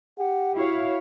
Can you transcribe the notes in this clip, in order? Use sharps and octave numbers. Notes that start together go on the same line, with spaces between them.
G4 F#5
E4 F#4 C#5 F5